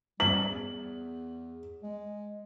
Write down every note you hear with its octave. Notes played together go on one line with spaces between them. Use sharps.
G3 F#7
E2
G#3